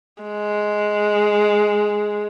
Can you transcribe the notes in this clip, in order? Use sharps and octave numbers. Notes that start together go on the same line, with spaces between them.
G#3